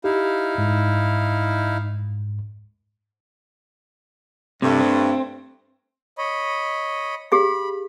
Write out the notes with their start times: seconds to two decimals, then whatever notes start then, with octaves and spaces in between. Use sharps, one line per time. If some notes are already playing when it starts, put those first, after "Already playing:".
0.04 D#4 E4 G4 F5
0.58 G#2
4.62 G2 C3 A3
4.80 C4
6.18 C#5 D#5 B5
7.32 G4 G#4 F5 B5